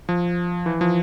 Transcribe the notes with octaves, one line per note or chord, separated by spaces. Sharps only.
F3
E3
F3